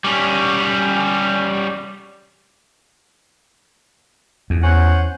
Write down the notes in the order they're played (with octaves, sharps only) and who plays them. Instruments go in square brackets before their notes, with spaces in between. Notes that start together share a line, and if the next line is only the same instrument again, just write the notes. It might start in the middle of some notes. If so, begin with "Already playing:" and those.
[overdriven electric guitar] G3 C#4
[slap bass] E2
[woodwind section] C#4 C5 F#5